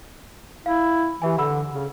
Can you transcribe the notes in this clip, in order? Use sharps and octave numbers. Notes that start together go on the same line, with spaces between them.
E4 F5
E3 G4 E5 G#5
D3 F#5 B5 E6
C#3